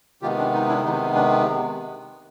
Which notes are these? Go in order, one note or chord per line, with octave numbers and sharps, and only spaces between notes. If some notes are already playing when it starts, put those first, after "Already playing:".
C3 D#3 G#3 B3 F4 G4
D4
D#4
D4 E4
C3 D#3 G#3 B3 D#4
D4